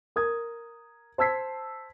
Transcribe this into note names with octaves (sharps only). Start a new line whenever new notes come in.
A#4 D#6 G#6
C5 A5 E6 G#6 B6 C7